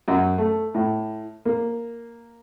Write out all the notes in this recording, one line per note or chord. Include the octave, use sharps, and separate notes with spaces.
F#2
A3
A2
A#3